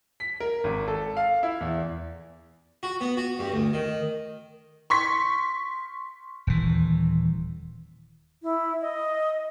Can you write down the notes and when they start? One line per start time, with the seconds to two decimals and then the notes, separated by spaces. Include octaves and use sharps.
0.20 B6
0.40 A#4
0.64 G#1
0.88 A4
1.17 F5
1.43 E4
1.61 E2
2.83 F#4
3.01 B3
3.17 F#4
3.39 G2
3.52 D2
3.73 D#3
4.90 C6 C#6 B6
6.47 D#1 E3
8.43 E4
8.82 D#5